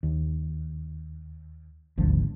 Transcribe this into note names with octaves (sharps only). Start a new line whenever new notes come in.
D#2
D#1 G#1 D2 F3